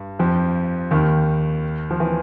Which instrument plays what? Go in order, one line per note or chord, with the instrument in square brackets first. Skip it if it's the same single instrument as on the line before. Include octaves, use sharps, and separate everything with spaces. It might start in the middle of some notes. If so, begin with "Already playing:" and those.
Already playing: [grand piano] G2
F2 F3
D#2 D#3
F3
E3